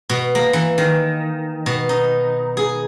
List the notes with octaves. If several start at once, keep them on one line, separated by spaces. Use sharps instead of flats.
B2
A#3
E3
D#3
B2
D#4
G#4